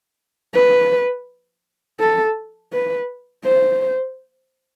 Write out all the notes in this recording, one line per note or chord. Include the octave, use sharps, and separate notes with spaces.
B4
A4
B4
C5